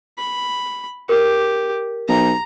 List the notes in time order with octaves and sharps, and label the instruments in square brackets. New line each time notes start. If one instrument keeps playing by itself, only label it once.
[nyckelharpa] B5
[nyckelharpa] G4 [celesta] A#4
[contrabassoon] B1 [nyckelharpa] A#5